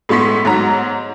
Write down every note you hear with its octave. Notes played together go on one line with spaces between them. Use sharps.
A2 G#3 B3 C6 B6
G#2 F#3 A#5